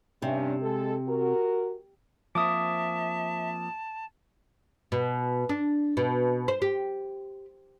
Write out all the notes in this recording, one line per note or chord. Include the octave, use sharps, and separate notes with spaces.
G2 C3 C#4 D4
G#3 A4
F#4 A#4
F3 A#3 C4 E5 A5 D6 D#6
B2
D4
B2
C5
G4